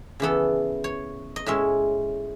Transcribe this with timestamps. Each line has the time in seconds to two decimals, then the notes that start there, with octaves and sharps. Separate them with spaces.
0.20 C#3 E3 B3 A4
0.84 C#5
1.36 D#5
1.46 A2 G#3 C#4 E5